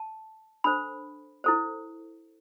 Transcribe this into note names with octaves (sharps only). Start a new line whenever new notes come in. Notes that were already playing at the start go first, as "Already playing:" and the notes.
Already playing: A5
D4 A4 C5 B5
E4 A4 C5